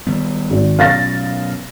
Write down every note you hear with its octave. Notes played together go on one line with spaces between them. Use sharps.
D#3 G3 B3
G#1
B2 F#3 C#4 F5 A6 A#6